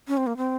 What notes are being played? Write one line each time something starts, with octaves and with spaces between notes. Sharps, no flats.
C#4
C4
A#3
C4